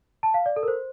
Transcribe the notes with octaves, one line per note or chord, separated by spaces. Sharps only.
A5
F5
D5
A4
A#4
C5